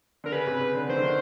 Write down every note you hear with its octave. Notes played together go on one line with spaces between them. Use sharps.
D3 A#4
C#3 B4
C3
C#3
D3
D#3 C5
D3
D#3